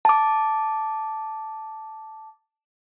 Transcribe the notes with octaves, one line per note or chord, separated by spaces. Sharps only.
A5 D6